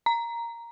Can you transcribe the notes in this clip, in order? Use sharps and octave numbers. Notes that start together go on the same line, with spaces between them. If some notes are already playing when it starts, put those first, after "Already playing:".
A#5